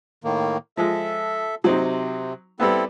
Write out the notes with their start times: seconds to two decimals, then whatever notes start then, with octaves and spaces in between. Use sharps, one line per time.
0.24 A2 D#3 A#3
0.77 F3 G#3 A4 E5
1.64 C3 F#3 C4 D#4
2.60 G3 B3 C4 E4 A4